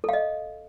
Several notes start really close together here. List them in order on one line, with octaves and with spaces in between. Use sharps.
A4 F5 D#5